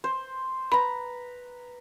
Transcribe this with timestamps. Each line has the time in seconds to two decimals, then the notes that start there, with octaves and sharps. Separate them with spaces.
0.04 C5
0.72 B4 A#5 B5